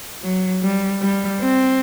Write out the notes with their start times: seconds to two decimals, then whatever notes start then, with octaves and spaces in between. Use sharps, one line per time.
0.23 F#3
0.62 G3
1.02 G3
1.41 C4